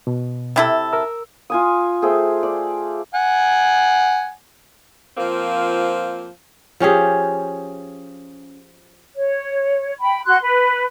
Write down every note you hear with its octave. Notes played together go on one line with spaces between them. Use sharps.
B2
C3 E4 A4
A#4 E6
F4 G#5 D#6
A3 G#4 C5 G5
D5
F#5 G#5
F3 A#3 C4 F4
F3 C#4 G4 G#4
C#5
G5 B5
F#4 C6 F#6
B4